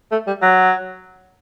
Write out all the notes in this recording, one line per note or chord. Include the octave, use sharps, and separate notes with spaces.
A3
G3
F#3